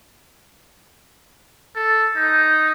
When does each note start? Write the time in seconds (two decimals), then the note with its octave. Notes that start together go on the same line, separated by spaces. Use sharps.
1.76 A4
2.16 D#4